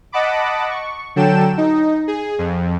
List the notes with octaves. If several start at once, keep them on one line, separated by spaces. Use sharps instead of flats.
D#5 F#5 A5 B5 D6
C#6
D3 F#3 A4 G5 E7
D#4
G#4
F2